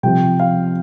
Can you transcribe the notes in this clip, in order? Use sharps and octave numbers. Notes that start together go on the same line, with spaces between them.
C3 F3 G5
F5